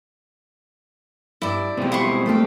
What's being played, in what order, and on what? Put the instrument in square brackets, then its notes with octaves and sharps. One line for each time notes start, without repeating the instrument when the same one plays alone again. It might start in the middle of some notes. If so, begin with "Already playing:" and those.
[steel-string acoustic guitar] G2 [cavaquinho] E4 D5
[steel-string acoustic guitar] B2 G4 [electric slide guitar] G3 G#3 C4
[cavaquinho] E4 C5 C#6
[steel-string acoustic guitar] A3 A#3 G4